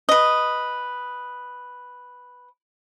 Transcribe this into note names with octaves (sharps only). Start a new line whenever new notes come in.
B4 D#5